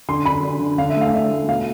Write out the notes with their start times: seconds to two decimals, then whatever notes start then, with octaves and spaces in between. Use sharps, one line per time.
0.09 D3 C6
0.25 D3 B5
0.43 D3
0.60 D3
0.78 D3 F5
0.90 E5
0.96 A3 F5
1.07 F5
1.13 D3 E5
1.31 A3
1.48 B2 F5